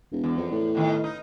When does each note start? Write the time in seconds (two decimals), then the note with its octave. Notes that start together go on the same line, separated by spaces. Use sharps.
0.12 E1
0.24 E2
0.37 F2
0.52 A2
0.75 B2 D#3 F4
1.04 D#4